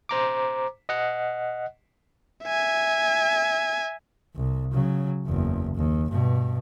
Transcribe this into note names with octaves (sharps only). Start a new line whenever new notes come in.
C5 A#5 D6
D#5 F#5
E5 G#5
C2
C#3 F#3
F#1 E2
D#2
G2 B2